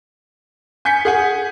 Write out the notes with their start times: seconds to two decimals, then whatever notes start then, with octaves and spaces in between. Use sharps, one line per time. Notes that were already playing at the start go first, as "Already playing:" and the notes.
0.85 G#5 G6 B6 C#7
1.05 G#4 F#5 G#5